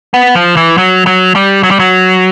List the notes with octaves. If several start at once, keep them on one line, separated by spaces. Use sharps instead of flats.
B3
F3
E3
F#3
F#3
G3
F#3
G3
F#3